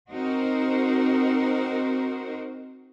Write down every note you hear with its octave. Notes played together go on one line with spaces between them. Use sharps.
C4 D#4 F#4 A#4 C5